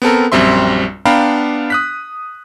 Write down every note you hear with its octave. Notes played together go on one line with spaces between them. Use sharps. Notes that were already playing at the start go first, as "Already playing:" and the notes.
B3 C4 A4 A#4
A#1 F#2 G3 C4 E5 C6
B3 D4 F5 G5 A#5 B5
D#6 F#6 B6